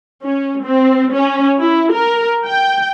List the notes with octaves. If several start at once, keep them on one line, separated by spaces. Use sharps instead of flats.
C#4
C4
C#4
E4
A#4
G5